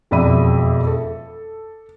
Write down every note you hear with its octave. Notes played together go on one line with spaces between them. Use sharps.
E1 F2 D5 E5 B5 D#7
A4